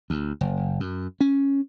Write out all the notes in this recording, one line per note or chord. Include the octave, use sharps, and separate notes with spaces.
D2
F#1
F#2
C#4